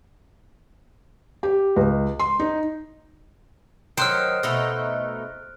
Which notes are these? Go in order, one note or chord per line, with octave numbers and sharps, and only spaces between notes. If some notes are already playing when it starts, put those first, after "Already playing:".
G4
C#2
C6
D#4
D#3 F#3 C5 F6 F#6 D7
B2 A3 D#4